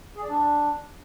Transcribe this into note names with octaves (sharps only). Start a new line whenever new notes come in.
G#4
D5
D4